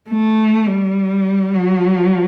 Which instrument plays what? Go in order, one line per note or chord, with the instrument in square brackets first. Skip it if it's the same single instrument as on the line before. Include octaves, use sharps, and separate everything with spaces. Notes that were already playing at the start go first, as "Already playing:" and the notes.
[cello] A3
G3
F#3